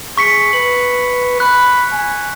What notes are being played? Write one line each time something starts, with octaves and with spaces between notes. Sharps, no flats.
G#4 C#6 B6 C#7
B4 F#7
B5 F#6
G#5